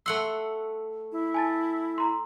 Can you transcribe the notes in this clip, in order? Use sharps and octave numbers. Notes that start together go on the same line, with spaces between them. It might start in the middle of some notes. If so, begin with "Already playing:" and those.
A3 F#5 C6 E6
E4
G#5 A5 A6
A#5 C6